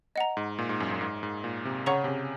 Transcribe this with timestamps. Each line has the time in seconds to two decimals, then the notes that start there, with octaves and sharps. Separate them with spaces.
0.16 D#5 F#5 A#5
0.37 G#2
0.58 A#2
0.69 G#2
0.80 F#2
0.91 F#2
1.01 G#2
1.23 G#2
1.44 A#2
1.65 C3
1.86 C#3 C#5 F#5 A#5 C#6
2.04 C3
2.08 C#3